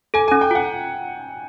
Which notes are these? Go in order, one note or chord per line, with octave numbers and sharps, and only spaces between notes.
A4 G#5
G#5
C#4
G5
F4 F#5